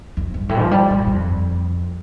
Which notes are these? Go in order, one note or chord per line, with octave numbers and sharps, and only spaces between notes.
F2
G2
A2
F3
G3
C3
A2
G2
F2